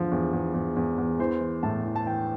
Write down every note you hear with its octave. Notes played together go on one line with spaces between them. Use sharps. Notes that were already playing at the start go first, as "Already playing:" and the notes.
Already playing: E2 D3 F3
E2
E2
E2
E2
E2
E3 C5
E3
A2 A5
E3
A5
E3 G5